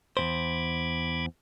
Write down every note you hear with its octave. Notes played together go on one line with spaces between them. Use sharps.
E2 A#2 C5 B5 D6 G#6